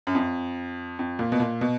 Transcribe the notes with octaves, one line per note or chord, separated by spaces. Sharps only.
F#2
F2
F2
A#2
B2
A#2
B2